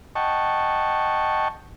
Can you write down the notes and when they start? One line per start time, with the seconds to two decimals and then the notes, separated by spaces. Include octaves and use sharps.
0.15 D#5 F#5 G5 A5 C#6